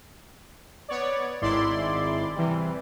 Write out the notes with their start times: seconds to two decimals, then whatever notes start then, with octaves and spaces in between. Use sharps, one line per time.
0.88 B3 C#5 D5
1.42 G#1 G#2 E4 D5 C6
2.36 C3 E3 G3